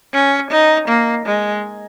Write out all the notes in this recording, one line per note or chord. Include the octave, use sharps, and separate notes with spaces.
C#4
D#4
A#3
G#3